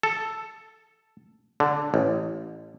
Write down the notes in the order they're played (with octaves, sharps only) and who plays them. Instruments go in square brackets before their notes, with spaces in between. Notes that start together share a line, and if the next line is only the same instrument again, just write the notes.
[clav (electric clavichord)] A4
D3
A1